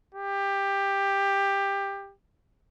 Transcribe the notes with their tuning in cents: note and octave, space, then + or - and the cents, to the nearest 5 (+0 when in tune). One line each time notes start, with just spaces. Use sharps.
G4 +15